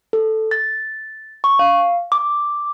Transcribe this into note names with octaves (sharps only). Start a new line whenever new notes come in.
A4
A6
C#6
F5
D6